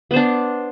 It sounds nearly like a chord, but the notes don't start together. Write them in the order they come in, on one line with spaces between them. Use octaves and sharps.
B3 C5 D4